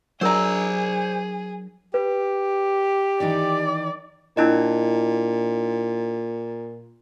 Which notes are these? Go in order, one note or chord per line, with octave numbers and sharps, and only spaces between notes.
F#3 D4 G#4 A#4 C5 D5 A#5
G4 B4
D#3 E3 D#4 D5
A#2 D4 E4 D#5